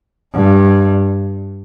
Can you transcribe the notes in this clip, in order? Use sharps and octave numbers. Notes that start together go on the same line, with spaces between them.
G2